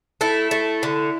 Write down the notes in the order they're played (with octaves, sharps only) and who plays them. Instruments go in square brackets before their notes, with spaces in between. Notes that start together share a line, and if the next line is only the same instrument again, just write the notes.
[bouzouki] A3 E4
A3
D3